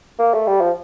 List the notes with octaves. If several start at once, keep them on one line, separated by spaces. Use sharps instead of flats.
A#3
A3
G3
F3